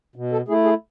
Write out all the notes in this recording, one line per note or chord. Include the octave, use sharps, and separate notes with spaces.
B2
A4
A3 E4 G#4
G#4